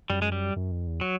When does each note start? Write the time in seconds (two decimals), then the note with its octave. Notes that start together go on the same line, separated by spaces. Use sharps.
0.09 F#2 G3
0.22 G#3
0.32 G3
0.56 F#2
0.72 F2
0.87 E2
1.01 F#3